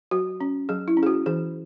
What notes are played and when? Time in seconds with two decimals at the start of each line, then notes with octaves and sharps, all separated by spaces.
0.11 F#3 F#4
0.41 C#4
0.69 F#3 G#4
0.88 E4
0.97 C#4
1.03 G#4
1.06 F#4
1.26 E3 G#4